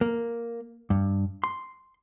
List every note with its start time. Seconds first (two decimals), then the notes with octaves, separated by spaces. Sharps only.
0.01 A#3
0.90 G2
1.44 C6